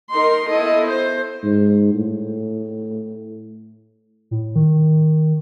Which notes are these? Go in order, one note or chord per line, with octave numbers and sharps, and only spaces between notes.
D#4 A#4 C6
B3 E4 A4 D#5
C5
G#2
A2
A2
D#3